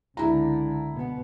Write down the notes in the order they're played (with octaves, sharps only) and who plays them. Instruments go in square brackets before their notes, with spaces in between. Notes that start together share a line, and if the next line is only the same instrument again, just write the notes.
[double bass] C#2 D3 [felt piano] E4 A#5
[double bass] B2 B3